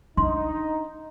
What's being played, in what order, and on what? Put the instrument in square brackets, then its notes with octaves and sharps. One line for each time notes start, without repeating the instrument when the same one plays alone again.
[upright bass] D4 [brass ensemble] D#4 [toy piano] C6